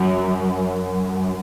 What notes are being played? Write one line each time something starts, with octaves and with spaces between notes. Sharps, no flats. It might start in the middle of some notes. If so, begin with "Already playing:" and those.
Already playing: F#2